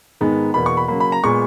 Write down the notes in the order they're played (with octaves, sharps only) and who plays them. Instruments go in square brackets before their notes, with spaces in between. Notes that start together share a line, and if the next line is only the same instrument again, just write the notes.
[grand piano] G#2 D#3 G#3 B3
E2 B2 A#3 B5
C#6
B5
C#3 F#3 A#3 B5
B5
A#5
A#2 G#3 B3 C#6